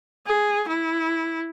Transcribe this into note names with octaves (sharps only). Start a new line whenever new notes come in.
G#4
E4